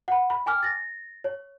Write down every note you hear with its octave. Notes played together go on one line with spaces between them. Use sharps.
F#5 B5
B5
G5 G#5 D6 F6
A6 A#6
C#5